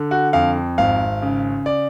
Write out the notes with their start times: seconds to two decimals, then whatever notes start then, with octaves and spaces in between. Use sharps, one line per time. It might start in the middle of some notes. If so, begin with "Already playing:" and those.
Already playing: D3
0.11 F#4
0.33 F2 F5
0.78 G#1 F5
1.22 C#3
1.66 D5